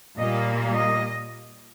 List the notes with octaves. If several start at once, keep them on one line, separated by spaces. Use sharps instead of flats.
A#2 G3 A#3 D#5
D#5